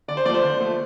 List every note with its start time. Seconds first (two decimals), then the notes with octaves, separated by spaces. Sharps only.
0.08 D3 D5
0.17 C5
0.25 F3 D5
0.30 A3 C5
0.43 D3
0.60 F3 A3